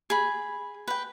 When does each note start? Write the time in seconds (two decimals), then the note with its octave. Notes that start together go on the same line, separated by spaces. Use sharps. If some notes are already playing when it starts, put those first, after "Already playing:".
0.10 G#4 B5
0.88 B4 G5